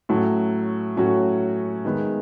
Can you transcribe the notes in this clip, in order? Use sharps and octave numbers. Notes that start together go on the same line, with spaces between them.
A2 F#3 C#4 F#4 A4
A2 F#3 C#4 F#4 A4
D#3 G#3 B3